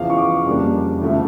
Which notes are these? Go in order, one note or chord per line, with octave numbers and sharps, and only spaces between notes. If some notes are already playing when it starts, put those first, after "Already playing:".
Already playing: E2 C#3 F3 F5
C#6
D6
F2 C#3 G3 A#3 D4
D2 C#3 F3 A3